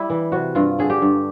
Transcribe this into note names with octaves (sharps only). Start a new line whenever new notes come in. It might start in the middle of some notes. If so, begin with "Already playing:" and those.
Already playing: G3 E4
E3
C3 F#4
G2 F4
D3 G#4
G4
G2